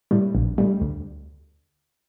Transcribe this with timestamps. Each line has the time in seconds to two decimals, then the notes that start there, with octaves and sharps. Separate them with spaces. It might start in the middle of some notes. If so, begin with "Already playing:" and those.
0.11 A2 G3
0.35 A#1
0.58 A2 G3
0.81 D2